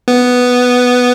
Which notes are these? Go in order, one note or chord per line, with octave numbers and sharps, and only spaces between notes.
B3